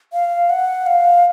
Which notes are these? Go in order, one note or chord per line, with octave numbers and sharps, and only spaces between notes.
F5
F#5
F5